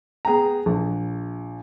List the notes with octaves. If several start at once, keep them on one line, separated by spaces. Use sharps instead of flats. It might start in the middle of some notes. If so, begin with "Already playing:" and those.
B3 G#4 G5 A#5
A#1